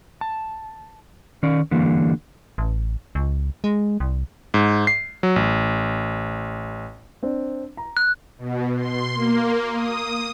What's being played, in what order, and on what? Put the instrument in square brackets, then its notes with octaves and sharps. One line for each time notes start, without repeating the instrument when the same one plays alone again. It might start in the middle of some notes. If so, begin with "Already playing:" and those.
[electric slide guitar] A5
D#3 C#4 D5
D3 E3 G3 A#3
[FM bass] A1
C#2
G#3
C2
[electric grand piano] G#2
C7
F#3
A1
[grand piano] C4 D4
A#5
[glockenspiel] F#6
[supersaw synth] B2
C6
A#3
D#6